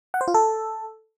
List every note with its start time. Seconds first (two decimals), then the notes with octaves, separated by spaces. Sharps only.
0.14 F#5
0.21 C5
0.28 F4
0.34 A4